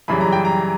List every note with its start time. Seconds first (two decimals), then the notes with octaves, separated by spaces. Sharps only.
0.08 F#2 C#3 E3 G3 B5
0.21 A#5
0.32 G5
0.45 A#5